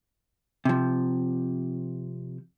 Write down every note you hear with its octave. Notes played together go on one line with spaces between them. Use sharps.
C3 F3